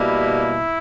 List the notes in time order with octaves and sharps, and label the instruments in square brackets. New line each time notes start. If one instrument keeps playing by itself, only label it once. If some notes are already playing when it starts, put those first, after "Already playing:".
Already playing: [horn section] B2 G3 A#3 E4